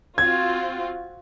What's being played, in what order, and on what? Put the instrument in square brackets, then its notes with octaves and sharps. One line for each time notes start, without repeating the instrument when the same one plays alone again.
[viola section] C4 F4 F#4 [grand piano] G#6